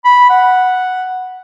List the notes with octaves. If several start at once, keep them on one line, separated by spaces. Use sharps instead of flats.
B5
F#5